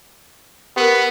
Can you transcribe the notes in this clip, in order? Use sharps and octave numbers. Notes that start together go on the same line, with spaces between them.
B3 G4 A#4